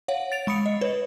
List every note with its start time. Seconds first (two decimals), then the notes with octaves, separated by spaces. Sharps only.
0.08 C#5 F5 F#5
0.32 A6 D7 F7
0.47 G#3 B5 D#6 C#7
0.66 D#5
0.81 B4 C#5